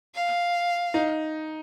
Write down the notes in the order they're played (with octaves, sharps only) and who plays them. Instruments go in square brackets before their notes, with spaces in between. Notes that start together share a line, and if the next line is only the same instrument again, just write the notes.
[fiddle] F5
[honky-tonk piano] D#4